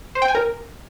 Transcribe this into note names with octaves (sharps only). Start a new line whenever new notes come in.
C5
G5
G#5
A#4